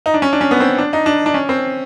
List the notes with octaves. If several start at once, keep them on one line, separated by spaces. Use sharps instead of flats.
D#4
D4
C#4
D4
C#4
B3
C4
D4
D#4
D4
D4
C#4
C4